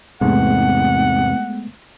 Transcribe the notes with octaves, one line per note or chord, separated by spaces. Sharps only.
E2 G#2 C3 G#3 A3 B3 F#5